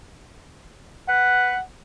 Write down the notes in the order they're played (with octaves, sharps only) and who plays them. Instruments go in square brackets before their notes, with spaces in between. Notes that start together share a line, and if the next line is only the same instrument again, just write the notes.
[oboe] B4 [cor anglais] F#5